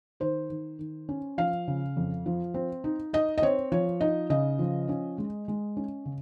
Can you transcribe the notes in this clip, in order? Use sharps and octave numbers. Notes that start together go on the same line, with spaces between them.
D#3 C5
D#3
D#3
C#4
F3 F5
C#3
F2
F3
C4
D#4
D#4 D#5
D#5
C4 C#5
F3 C#5
D#4 D#5
C#3 D#5
F3
C#4
G#3
G#3
C#4
C#3